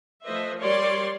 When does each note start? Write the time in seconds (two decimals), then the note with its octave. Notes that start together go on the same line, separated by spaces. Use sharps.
0.24 F3 A3 B4 C5 D#5 E5
0.60 G3 A#4 C#5 D5 C6